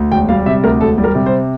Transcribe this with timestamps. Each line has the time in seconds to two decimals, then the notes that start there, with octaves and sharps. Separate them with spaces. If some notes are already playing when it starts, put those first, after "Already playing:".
Already playing: D2
0.11 E1 G5
0.29 G3 F5
0.46 C3 E5
0.63 D2 A#4
0.81 E1 A4
0.98 G3
1.04 A#4
1.15 C3
1.26 C5